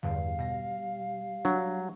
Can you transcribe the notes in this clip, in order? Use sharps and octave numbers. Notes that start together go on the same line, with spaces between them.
E2 G2 D3 G3 F5
B2 A#6
F#3 D4